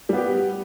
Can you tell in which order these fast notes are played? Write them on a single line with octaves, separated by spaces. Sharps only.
G3 B3 G4